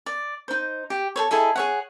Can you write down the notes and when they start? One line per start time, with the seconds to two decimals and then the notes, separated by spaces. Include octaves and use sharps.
0.06 D5
0.48 D#4 C5
0.90 G4
1.16 A4 C5 C#5
1.31 E4 G#4 A4 D#5
1.56 G#4 C#5 F#5